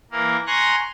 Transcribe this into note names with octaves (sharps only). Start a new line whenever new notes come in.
E3 A#3 A#4
G#5 A#5 C6 C#6 F#6 A#6